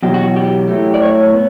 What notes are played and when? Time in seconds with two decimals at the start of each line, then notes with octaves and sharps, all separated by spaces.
0.03 E2 B2 F#3 G4
0.14 F#4
0.36 G4
0.68 A2 F#3 A3
0.94 D5
1.02 C#5
1.33 B3